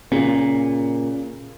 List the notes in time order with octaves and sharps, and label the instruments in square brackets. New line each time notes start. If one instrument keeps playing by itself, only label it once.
[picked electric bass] A#2 [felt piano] C#3